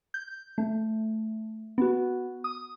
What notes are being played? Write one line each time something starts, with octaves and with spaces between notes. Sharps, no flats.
G6
A3
B3 F#4
D#6